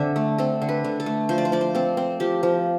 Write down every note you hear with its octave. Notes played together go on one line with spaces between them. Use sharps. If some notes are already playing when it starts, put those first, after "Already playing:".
Already playing: D3 C4 E5
A3
C4 A4
D3
B4
D3
A4
A3
F3 C5
D5
C5
F3 D5
C5
C4 A4
C4
F3 G4
F3